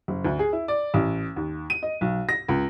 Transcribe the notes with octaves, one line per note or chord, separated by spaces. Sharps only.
F#1
D2
G#4
E4
D5
A1
D#2
D#7
D#5
B1
A#6
C#2